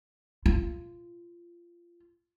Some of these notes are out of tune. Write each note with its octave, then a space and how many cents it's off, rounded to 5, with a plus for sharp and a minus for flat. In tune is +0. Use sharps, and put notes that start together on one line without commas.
F4 -20